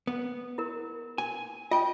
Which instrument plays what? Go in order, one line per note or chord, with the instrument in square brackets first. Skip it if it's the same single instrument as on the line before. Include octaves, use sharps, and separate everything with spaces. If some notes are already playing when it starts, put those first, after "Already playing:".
[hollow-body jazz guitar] B3
[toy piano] E4 A#4
[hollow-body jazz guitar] G#5
[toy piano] F4 [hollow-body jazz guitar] D#5 G5